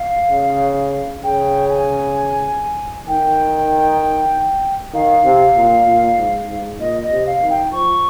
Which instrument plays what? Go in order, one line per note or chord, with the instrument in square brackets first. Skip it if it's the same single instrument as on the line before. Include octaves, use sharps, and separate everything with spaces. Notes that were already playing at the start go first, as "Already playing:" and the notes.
Already playing: [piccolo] F5
[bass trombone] C#3
[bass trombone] C#3 [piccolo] G5
[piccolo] G#5
[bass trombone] D#3 [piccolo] G5
[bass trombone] D#3 [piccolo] F5
[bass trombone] C3
A#2
A#2
G#2
G#2
[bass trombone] A#2 [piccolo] D#5
[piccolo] D#5
[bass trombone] C3
[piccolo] F5
[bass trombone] D#3
[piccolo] G5
[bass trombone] F3 [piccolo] C#6